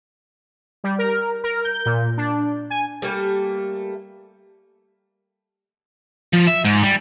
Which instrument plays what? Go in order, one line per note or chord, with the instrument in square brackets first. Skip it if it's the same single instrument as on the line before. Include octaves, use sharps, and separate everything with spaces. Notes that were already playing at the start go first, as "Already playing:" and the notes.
[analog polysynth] G3
A#4
A#4
G6
A#2
D4
G#5
[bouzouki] G3 A3 A#3
[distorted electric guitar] F3
E5
G#2
G3